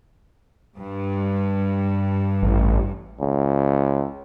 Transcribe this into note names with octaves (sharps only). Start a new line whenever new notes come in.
G2
A1
C#2